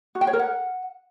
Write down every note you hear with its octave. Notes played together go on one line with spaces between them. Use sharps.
F#4
G5
C#5
A#4
F#5